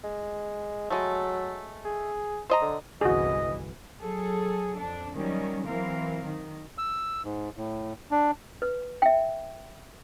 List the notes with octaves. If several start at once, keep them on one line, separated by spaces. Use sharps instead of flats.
G#3
F#3 G#3 A3
G#4
C5 D#5 A#5
D3
G1 C2 E3 F#4 G#4 D#5
F#3 G#4 A4
F2 D4
D#3 F#3 G3 C#4
E3 F#3 C4 A#4 F5
D#3
E6
G#2
A2
D4
B4
E5 G5